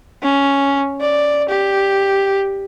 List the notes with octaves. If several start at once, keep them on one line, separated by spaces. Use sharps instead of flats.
C#4
D5
G4